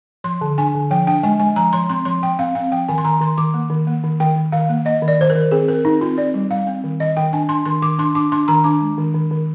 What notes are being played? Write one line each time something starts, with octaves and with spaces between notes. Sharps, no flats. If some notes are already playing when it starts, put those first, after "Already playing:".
F3 C6
D3
D4 G#5
D3
F3 G5
D4 G5
G#3 G#5
G#3 G#5
F3 A#5
F3 C6
C4 C6
F3 C6
F3 G5
C4 F5
C4 F5
F3 G5
D#3 G#5
C6
D#3 A#5
D#3 C6
D#3 D6
A#3
D#3
A#3
D#3
D#3 G5
D#3
D#3 F5
A#3
A#3 D#5
D#3
D5
D#3 C5
A#4
D#3
C4 G#4
C4 A#4
C4 D#4
C4 F4
C4 D5
G3
G3 F5
C4
D#3
D#3 D#5
D#3 G5
D4 G#5
D4 C6
D#3 C6
D#3 D6
D4 C6
D4 D6
D4 C6
D#3 A#5
D4 D6
G#3
D#3
D#3
D#3